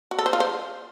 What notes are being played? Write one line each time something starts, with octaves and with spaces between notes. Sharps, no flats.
F#4
A4
C5
F4
C5